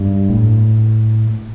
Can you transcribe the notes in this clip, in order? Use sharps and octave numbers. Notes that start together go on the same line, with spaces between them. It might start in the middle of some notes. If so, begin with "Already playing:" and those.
Already playing: G2
A2